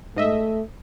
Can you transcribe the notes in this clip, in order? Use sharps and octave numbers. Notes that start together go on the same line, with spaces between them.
G#2 A3 D#5 E5